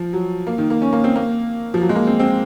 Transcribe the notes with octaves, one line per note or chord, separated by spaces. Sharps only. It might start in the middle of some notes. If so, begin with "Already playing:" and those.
Already playing: F3
F#3
A#3
D#3
A#3
C#4
A#3
C4
A#3
F3
F#3
G#3
A#3
C4
C4